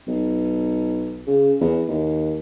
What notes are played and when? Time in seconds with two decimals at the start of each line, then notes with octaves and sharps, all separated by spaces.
0.07 B1
1.27 C#3
1.60 E2
1.88 D#2